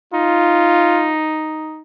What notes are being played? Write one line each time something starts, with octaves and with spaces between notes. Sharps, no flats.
D#4 F4